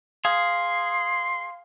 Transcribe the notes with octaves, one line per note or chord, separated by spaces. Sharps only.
G#4 F5 C6